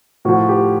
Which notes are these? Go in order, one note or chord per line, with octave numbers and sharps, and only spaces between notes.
A2 F3 F#4
G4